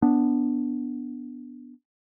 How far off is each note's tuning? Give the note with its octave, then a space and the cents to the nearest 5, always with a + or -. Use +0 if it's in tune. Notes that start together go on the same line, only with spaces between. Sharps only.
B3 +0 D4 -5